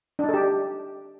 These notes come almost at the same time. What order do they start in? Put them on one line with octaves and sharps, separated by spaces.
D4 D#4 A4 G4